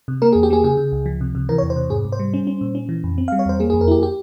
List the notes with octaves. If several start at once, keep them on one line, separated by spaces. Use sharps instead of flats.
C3
A#3 A#4
G#4
E2
G4
A#3 G#4
C#3 G#4
C#3
C#2
F3
C3
C3
E3 A#4
C#5
E2
C5
C3
G#2 G#4
G#2
C5
G3
C#4
C#4
A#2
C#4
E3
F2
C4
F5
G3
C#5
E2 C5
A#3 G#4
G#4
F2
A#4
E4 G4
G4